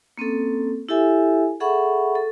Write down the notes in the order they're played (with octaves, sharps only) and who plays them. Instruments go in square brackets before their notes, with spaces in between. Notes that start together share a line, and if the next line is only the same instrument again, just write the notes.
[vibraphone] A#3 C4 C#4 A4
E4 G4 A4 E5 G#5
G#4 A4 E5 F#5 B5 C#6
A4